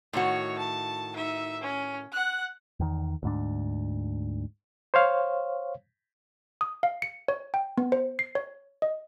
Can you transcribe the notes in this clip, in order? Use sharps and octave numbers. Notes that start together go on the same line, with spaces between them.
A2 D#3 F#4 C#5
A5
D#4 E5
C#4
F#5 F#6
E2 D#3
D2 G#2 D4
C5 C#5 F5
D#6
F5
C#7
C#5
G5
B3
C5
C7
C#5
D#5